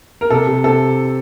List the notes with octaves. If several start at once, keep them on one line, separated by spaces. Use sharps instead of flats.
A#4
C3 A4
C3
C3 A4